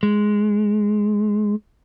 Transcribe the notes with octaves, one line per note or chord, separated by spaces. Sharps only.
G#3